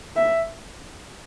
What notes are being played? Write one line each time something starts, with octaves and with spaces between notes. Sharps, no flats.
E5